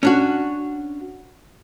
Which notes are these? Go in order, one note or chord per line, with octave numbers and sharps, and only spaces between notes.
C#4 D4 F#4